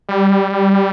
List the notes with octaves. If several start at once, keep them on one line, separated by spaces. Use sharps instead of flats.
G3